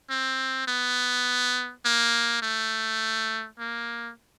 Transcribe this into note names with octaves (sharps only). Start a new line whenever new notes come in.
C4
B3
A#3
A3
A#3